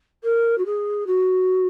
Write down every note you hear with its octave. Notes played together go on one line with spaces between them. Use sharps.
A#4
F#4
G#4
F#4